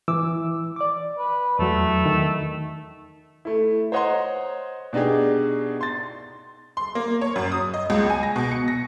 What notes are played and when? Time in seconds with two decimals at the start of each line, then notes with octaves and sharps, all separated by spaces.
0.08 E3 D6 E6
0.76 D5 D6
1.18 B4
1.59 E2 F#3 A3
2.06 D#3
3.45 A3 E4
3.92 C5 C#5 D#5 F#5 A#5 C6
4.93 B2 D4 D#4 G4 G#4
5.81 C6 A6
6.77 C6
6.95 A#3
7.21 C#5
7.36 F#2
7.52 D#6
7.74 D#5
7.90 C#2
8.10 G#5
8.23 A#6
8.36 B2
8.51 C#7
8.68 A#6